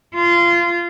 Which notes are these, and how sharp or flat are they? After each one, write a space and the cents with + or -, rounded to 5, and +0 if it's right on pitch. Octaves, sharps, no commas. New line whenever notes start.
F4 -20